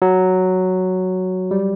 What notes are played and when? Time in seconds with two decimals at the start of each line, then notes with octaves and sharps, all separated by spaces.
0.02 F#3
1.51 G3